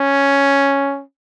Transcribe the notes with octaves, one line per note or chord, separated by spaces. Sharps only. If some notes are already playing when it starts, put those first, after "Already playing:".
Already playing: C#4